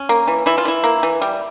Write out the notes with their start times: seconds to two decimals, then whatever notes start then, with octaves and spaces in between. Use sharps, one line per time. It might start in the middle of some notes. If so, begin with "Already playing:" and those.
Already playing: C#4
0.09 A#3
0.27 E3
0.46 E3 E4
0.58 F4
0.65 E3 E4
0.84 A#3
1.03 E3
1.22 G3